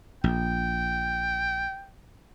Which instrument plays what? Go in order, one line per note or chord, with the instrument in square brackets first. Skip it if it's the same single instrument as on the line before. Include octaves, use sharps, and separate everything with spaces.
[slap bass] A#1 [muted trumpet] G5